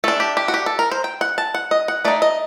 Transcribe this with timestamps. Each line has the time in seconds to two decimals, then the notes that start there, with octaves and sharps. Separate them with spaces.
0.04 A3 D4 A4
0.20 G4
0.37 G4
0.48 F#4
0.54 G4
0.66 A4
0.79 A#4
0.92 C5
1.04 G5
1.21 F#5
1.38 A5
1.55 F#5
1.71 D#5
1.88 F#5
2.05 A3 D#4 D5
2.22 D#5